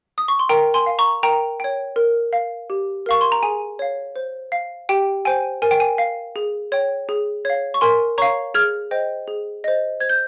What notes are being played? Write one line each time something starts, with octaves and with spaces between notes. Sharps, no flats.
D#6
C#6
C6
A#4 G5 A#5
G#5 C6
F5
A#5 C#6
A#4 G5 A#5
C#5 G5
A#4
F5
G4
A#4 F5 C#6
C6
A#5
G#4 G#5
C#5 F5
C5
F5
G4 G5
C5 G5 G#5
A#4 G#5
G5
G#5
F5
G#4
C#5 G5
G#4
C#5 F5
C#6
A#4 G#5 C6
C#5 F5 A#5 C#6
G#4 F6 G#6
C5 D#5 G5
G#4
C5 D#5
C5 G#6
G6